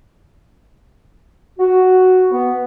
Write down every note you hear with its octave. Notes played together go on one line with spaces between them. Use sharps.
F#4
B3